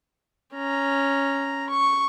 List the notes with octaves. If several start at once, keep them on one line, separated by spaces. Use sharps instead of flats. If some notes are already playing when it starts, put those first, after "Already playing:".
C#4 A#5
C#6